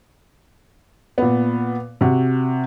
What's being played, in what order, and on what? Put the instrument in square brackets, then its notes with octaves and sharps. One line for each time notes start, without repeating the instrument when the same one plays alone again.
[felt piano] A#2 B3
C3 F#4